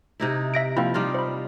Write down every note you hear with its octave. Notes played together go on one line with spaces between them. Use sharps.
C3 D#4 E4
E5 A#6 D7
F3 A#3 C4 E4
G3 D#4 F4
C5 B5